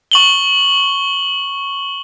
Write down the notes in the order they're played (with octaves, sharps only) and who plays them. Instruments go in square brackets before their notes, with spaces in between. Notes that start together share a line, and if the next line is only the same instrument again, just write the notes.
[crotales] C#6 F#7 G7